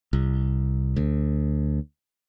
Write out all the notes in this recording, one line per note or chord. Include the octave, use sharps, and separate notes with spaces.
C2
D2